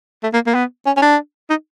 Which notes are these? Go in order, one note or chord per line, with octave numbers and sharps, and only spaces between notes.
A3
A#3
A#3
B3
C#4
C#4
D4
D#4